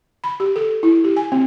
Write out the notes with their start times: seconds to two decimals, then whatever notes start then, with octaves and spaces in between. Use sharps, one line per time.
0.24 B5
0.40 G4
0.56 A4
0.83 E4
1.04 G4
1.16 G#5
1.32 C4